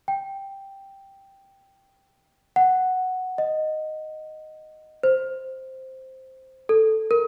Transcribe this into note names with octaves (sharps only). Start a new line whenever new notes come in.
G5
F#5
D#5
C5
A4
A#4